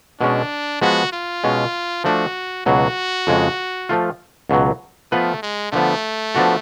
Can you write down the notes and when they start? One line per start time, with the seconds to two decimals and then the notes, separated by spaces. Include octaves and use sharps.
0.20 B2 G#3 C#4 D4
0.81 F3 G#3 B3 F#4
1.12 F4
1.44 B2 G#3 C#4
2.04 F3 A3 D4 F#4
2.66 C#2 B2 F#3 F#4
3.27 F2 C#3 G#3
3.89 F3 A3 F4
4.50 C#2 B2 F#3
5.11 F3 A3 B3 F4 B4
5.43 G#3
5.72 D3 F3 A3 B3
6.35 F3 B3 D4 F#4 A4